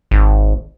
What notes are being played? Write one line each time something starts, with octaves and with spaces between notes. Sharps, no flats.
G#1